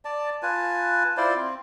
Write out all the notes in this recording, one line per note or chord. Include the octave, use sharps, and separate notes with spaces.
D5 A5
F4 B4 G#5 A5
E4 F4 C5 D5
C4